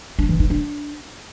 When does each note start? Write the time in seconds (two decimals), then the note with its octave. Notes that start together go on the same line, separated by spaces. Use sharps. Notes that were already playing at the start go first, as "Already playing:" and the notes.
0.19 D4
0.29 E3
0.40 D#4
0.50 D4